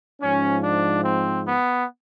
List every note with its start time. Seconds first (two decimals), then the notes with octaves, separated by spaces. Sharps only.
0.21 G#2 F3 C#4
0.64 D4
1.04 C4
1.47 B3